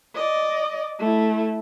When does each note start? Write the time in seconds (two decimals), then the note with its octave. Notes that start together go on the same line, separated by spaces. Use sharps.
0.15 D5 D#5
0.99 A3 E4